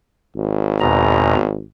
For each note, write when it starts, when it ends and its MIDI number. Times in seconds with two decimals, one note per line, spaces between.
0.36 1.62 32
0.81 1.36 40
0.81 1.36 47
0.81 1.36 82